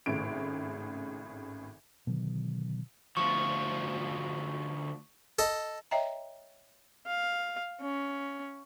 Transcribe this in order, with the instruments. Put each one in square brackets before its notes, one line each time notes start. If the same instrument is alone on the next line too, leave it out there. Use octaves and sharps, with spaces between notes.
[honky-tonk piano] G#1 A2 C#3 D7
[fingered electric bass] B2 D3 D#3 F#3
[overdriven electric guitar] D2 F3 [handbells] C#6
[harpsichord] A4 D#5
[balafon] C#5 D#5 E5 G5 A#5
[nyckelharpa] F5
C#4